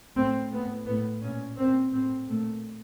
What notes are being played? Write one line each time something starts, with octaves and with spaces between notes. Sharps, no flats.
A2 C4
A2 B3
A2 B3
A#2 C#4
A#2 C4
A2 C4
A#2 A3